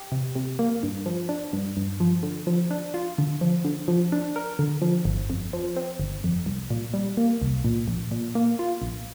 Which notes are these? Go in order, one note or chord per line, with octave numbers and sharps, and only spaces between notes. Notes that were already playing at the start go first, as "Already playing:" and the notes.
Already playing: G4
C3
C3
A#3
G2
F3
D4
G2
G2
F3
D3
F3
D4
F4
D3
F3
D3
F3
D4
A#4
D3
F3
G1
F2
F3
C4
G1
F2
C2
A#2
G3
A#3
C2
A#2
A#1
A#2
A#3
F4
A#1